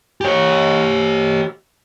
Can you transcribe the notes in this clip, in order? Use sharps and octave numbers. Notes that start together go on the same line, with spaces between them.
G4 C#5